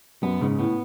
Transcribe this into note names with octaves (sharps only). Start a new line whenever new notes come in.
F#2 B3
G#2 C#3
A2 B3